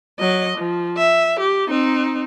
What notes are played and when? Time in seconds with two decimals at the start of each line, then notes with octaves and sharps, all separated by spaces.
0.20 F#3 D#5
0.58 F3
0.97 E5
1.40 G4
1.69 C4 D#4